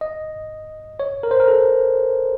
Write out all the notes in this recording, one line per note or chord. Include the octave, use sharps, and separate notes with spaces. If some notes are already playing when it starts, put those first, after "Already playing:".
D#5
C#5
A#4
C5
A#4
A4